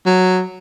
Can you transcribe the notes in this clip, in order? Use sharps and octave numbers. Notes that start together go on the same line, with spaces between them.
F#3